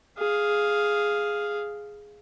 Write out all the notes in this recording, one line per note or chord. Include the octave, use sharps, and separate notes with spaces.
G#4 F5